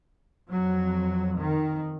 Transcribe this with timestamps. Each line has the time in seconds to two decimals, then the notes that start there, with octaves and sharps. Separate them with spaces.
0.50 F2 F#3
1.38 D#3